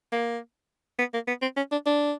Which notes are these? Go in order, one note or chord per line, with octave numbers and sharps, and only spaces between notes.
A#3
B3
A#3
B3
C4
C#4
D4
D4